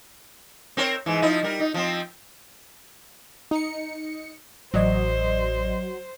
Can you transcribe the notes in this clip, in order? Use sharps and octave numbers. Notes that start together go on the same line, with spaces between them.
C4 A#4 C#5
G#2 E3
F3 D#4 E4
G3 A#4
D#4
F3 C4
D#4 C#7
A1 F#3 C5 D5 D#5